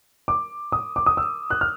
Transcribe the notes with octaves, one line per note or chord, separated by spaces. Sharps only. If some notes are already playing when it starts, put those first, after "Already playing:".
D6
D#6
D6
D#6
E6
F#6
F6